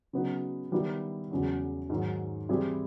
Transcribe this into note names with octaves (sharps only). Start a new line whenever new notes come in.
C#3 F#3 B3 D#4
D#3 G3 B3 E4
E2 C#3 F#3
G#2 D#3 F#3
E3 G3 C4 E4 G#4